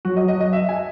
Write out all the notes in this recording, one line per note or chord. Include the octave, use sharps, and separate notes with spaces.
F#3 F#4
D#5
D#5
D#5
E5
G#5